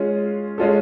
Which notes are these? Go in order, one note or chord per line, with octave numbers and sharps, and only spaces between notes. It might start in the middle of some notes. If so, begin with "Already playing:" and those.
Already playing: G#3 C#4 F4
G#3 C#4 F4 A4